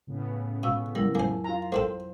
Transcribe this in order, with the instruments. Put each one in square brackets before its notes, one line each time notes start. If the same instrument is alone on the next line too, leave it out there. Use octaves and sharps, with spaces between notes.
[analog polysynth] A2 C#3 B3
[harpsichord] B2 [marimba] F5 C#6 E6
[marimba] F#3 E4 A#4 [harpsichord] G3
[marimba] F2 G#5 [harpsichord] A#3 C5
[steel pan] F4 A#5
[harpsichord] A#3 C4 A4 [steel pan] C5